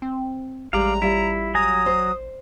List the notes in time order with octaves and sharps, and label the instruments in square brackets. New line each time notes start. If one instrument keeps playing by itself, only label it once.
[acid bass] C4
[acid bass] A1 [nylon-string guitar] G3 G#3 [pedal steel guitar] D5 F5 [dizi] A#5
[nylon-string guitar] G3 F4 [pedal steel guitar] E4
[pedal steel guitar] F#3 G#5 A#5 [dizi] D#6
[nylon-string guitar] C5